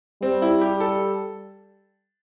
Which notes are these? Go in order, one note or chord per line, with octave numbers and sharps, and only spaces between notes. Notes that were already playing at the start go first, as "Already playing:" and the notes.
G3 C4
E4
G4
A4